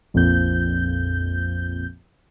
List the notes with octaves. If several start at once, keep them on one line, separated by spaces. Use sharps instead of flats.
A#1 F2 G6